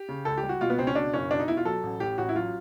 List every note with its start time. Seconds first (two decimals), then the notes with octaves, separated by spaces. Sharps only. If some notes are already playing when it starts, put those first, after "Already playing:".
Already playing: G4
0.09 C#3
0.25 C#2 A4
0.37 G4
0.43 G3
0.49 F#4
0.61 B2 F4
0.70 B3
0.78 C#2 C4
0.87 C#4
0.95 B2 D4
1.13 F#1 C#4
1.31 B2 D4
1.40 D#4
1.48 B2 E4
1.57 F4
1.65 F#3 A4
1.83 A1
2.00 A2 G4
2.18 A1 F#4
2.29 E4
2.36 F#3 F4